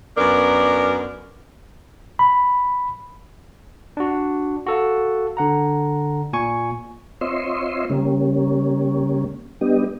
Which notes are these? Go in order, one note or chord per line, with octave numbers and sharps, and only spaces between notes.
F#2 B3 D4 A#4
B5
D4 F#4
F#4 A4 F5
D3 F#5 A#5
A#2 G#5 C#6
C4 F4 C#5 D#5 E5 C6
C#3 G3 A#3 C#4
G3 B3 D4 G4 D#5